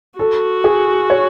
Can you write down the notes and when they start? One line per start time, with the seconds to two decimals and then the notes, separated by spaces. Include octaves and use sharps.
0.19 F#4 A4
0.64 G#4
1.10 C#5